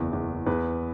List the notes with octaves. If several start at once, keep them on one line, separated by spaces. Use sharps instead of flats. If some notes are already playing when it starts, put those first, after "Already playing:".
Already playing: F#1 E2
E2
E2 B4